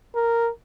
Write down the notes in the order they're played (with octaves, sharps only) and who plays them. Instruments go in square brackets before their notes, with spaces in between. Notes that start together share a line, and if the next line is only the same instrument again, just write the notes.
[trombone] A#4